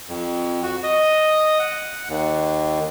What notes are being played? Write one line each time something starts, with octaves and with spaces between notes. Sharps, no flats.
F2
F#4
D#5
F#5
D#2